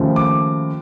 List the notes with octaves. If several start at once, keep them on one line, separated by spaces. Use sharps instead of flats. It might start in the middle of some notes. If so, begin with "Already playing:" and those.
Already playing: D#2 C#3 F3 A3
D6